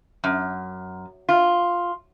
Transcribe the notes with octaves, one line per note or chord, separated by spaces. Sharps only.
F#2
F4